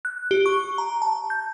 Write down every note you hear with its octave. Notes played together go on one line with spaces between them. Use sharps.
F#6
G4
C#6
A#5
A5
G6